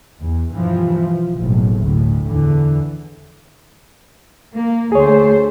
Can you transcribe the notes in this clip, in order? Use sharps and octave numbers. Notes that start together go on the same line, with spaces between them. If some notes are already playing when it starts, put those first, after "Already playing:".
E2
G2 B2 E3 F3
F3
F#1 B1 A2
D2 A2
E2 D3 E3
A#3
D2 A3 G#4 C5 C#5